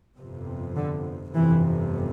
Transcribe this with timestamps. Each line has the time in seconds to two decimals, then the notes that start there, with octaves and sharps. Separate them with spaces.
0.19 G1 F2 C3
0.77 D3
1.34 G1 F2 C3 E3